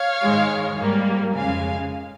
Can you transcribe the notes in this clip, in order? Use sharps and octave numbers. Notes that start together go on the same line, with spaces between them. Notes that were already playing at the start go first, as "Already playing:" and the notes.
Already playing: C#5 F5
G#2 D#3 G#3
G#2 G3 A#3
F2 C#3 G#3 F5 G#5